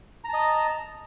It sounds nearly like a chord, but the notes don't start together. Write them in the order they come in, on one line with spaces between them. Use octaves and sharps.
A#5 A5 D#5